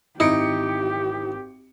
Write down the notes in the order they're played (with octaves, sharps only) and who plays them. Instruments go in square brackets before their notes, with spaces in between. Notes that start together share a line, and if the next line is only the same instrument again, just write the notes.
[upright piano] G#1 C#7 D7 [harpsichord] D#4 [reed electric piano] E4 [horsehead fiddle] G4